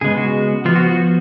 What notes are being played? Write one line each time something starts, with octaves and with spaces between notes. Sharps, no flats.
C#3 G#3 B3 G#4
F#4
F3 B3 F4
F#4
F#4